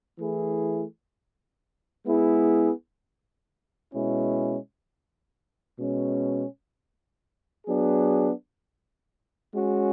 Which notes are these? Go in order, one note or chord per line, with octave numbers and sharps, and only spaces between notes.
E3 A3 E4 G#4
G#3 B3 E4 G#4
B2 G#3 C#4 E4
B2 G#3 C#4
F#3 B3 D4 G#4
G#3 C#4 F#4